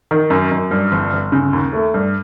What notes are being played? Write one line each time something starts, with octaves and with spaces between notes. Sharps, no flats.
D#3
F#2
F#2
G2
G1
G1
C#3
D#2
A3
G2